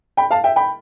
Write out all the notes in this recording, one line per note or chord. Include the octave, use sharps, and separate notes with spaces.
G5 B5
F5 A5
E5 G5
G5 B5